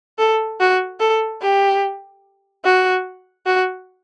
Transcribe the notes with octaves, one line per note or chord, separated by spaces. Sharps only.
A4
F#4
A4
G4
F#4
F#4